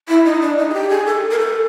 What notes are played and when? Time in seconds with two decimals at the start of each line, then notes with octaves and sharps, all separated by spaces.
0.09 E4
0.25 D#4
0.41 D4
0.58 D#4
0.70 G#4
0.74 G4
0.90 G#4
1.06 A4
1.31 A#4
1.39 A4